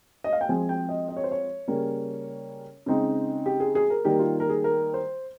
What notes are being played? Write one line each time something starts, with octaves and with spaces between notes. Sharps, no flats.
D#5
F5
G5
F3 G#3 C4 G#5
G5
D#5
D#5
C#5
C5
C#5
C#3 G3 A#3 C#4
C#3 G#3 C4 D#4
G4
G#4
G#4
A#4
D#3 G3 A#3 G4
F4
A#4
G#4
A#4
C5